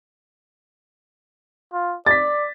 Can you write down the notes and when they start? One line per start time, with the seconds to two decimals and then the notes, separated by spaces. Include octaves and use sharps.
1.73 F4
2.06 D5 A6 B6